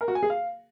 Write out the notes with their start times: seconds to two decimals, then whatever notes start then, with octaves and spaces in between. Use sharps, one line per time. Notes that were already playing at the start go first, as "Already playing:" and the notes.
0.01 A#4
0.08 F#4
0.15 G#5
0.23 G#4
0.30 F5